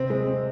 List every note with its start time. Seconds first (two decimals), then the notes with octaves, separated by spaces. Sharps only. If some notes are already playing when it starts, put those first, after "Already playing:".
Already playing: C3 C4
0.10 G#3
0.27 C4